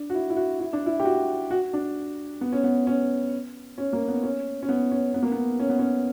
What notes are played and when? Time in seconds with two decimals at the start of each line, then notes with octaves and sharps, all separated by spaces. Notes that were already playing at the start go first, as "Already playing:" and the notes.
Already playing: D4
0.10 F#4
0.14 E4
0.30 E4
0.36 F#4
0.60 E4
0.73 D4
0.86 E4
1.00 G4
1.05 F#4
1.51 F#4
1.73 D4
2.41 B3
2.52 C#4
2.64 B3
2.87 C#4
3.78 C#4
3.93 A#3
4.08 B3
4.23 C#4
4.63 C#4
4.69 B3
4.92 C#4
5.14 B3
5.23 A#3
5.32 B3
5.60 C#4
5.69 B3
5.79 C#4